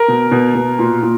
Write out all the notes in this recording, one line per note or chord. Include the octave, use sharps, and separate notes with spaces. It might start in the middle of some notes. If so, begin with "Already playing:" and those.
Already playing: A#4
B2
B2
B2
A#2
A#2